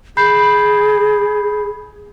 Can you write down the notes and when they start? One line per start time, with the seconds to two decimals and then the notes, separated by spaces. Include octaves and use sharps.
0.17 G#4 B5 G6 C7